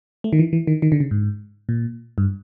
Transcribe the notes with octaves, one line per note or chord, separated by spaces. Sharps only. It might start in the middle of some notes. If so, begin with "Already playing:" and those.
A3
D#3
E3
E3
D#3
D#3
D3
C#3
G#2
A#2
G2